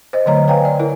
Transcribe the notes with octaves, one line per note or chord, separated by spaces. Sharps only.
C5 D#5
D3 F#3 A3 C#5 D#5 A#5
B4 C#5 F5 G5 G#5 A#5
D5
E4 A#4 C#5